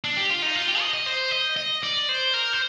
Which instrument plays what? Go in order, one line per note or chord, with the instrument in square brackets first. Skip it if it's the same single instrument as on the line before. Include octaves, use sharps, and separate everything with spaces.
[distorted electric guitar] D4
G4
F4
D#4
F4
G4
D#5
D#5
C5
D#5
D#5
D5
C5
A#4
C5